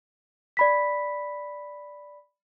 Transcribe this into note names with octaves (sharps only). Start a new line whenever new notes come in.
D5 B5 B6